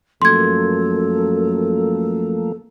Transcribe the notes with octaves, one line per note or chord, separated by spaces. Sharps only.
F#2 F3 A3 A#3 A4 C6 G#6